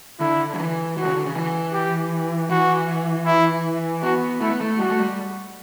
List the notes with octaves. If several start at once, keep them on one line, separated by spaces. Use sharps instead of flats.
D3 E4
F#3
E3
E3 F#4
D3
C#3
D3
C#3
E3
G4
E3 F#4
E4
B3 F#4
A3 E4
B3
A3
G3 F#4
A3
G3